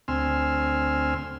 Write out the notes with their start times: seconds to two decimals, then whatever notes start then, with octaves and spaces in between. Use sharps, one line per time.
0.08 D2 C4 G#5 C6 E6 F6